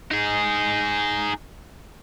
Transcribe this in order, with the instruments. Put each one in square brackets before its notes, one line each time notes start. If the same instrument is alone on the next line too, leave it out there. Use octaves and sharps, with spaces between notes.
[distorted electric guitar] D#4 G#4